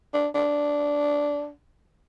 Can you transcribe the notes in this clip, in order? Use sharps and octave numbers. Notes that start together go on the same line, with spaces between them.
D4
D4